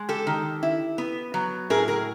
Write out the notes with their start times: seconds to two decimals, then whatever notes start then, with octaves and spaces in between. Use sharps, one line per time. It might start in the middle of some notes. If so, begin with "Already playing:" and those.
Already playing: G#3
0.09 G4 A4
0.27 D#3
0.63 E4
0.98 B3
1.34 F#3
1.70 A2 G#4 A#4
1.88 G#4 A#4